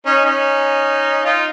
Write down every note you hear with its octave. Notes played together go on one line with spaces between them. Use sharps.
C#4 D#4
C#4 D#4
D#4 F4